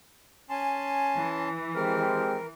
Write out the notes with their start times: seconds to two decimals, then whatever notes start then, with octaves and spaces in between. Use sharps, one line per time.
0.50 C#4 G#5 A5 C6
1.19 E3
1.75 G#3 C4 G4 A#4 F6